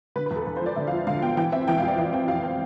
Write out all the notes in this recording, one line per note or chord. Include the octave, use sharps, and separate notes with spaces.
D3 B4
B4
E2
A4
E2 B4
C5
F3 D5
D3 E5
F5
F3
D3 F5
B3 G5
E3 G5
C4 E5
E3 G5
F5
F2
D5
E3 E5
C4 G5
F2 F5
C4 G5